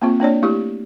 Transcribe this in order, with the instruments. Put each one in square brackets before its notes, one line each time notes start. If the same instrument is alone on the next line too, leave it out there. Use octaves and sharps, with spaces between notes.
[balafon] A#3 C4 F4
A#3 D4 C#5 D5
A3 E4 G4